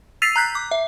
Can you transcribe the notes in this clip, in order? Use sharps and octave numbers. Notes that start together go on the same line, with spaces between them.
E6 A6 B6 C7 D#7 F7
A#5 F#6 G6 B6
D6
E5